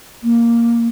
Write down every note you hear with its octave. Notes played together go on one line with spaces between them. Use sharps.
A#3